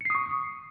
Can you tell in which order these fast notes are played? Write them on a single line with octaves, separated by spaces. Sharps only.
C#7 C7 D#6 C#6